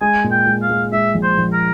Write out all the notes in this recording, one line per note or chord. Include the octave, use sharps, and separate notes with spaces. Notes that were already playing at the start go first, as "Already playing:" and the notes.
G#3 G#5
A#2
G5
G#3
F5
G#3
G#3 E5
A#1
C5
A#1
A#4